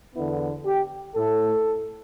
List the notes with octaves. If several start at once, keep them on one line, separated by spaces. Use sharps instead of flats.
E2 D3 B3 E4
G4
A2 A3 A4